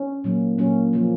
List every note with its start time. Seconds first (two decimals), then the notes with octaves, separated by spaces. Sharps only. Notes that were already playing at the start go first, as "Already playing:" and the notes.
Already playing: C#4
0.24 A#2 F#3 A#3
0.58 A#2 F#3 A#3 C#4
0.93 C#3 F3 A#3